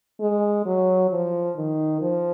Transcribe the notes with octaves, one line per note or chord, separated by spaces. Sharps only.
G#3
F#3
F3
D#3
F3